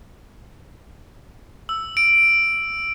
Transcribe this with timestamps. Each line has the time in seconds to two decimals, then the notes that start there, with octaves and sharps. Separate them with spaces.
1.69 E6
1.97 D7